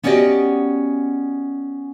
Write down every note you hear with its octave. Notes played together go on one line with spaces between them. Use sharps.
B3 C#4 F#4 G4 D5 D#5